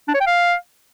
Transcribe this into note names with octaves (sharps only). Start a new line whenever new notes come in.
D4
C#5
G5
F5